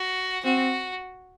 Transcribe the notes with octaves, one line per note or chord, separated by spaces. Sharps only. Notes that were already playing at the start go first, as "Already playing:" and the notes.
Already playing: F#4
C4 F#4